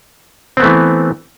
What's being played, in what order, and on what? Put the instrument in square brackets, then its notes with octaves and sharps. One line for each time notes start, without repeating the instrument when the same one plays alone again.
[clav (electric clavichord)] C4
B3
A3
E3